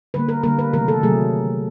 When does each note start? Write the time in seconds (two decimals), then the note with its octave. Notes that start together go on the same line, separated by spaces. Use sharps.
0.14 D3 G3 A#3 B4
0.29 A#4
0.43 D3 G3 A#3 A#4
0.59 B4
0.73 C3 D#3 F#3 A3 A#4
0.88 A4
1.03 C3 D#3 F#3 A3 G#4